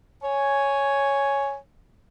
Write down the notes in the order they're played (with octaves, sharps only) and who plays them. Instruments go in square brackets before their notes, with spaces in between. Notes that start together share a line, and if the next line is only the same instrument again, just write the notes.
[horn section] C#5 G#5